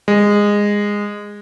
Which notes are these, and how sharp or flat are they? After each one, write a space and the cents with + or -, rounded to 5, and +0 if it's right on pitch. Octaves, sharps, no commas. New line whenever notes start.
G#3 -15